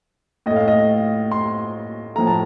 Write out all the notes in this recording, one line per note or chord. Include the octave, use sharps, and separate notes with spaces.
A2 A3 D#5
F5
D#5
C6
A2 F3 A3 A#5
A5